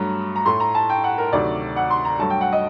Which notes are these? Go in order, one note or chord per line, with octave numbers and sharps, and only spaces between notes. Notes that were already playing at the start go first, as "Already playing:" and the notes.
Already playing: G2 F#3 A3 A#5
A#5
A2 A3 C6
A#5
A5
G5
F#5
A#4
D2 C3 D#3 F#3 D5
F#5
C6
A#5
G2 F#3 A3 A5
G5
F#5
D#5